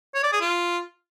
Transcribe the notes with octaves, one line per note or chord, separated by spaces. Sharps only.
C#5
D5
G#4
F4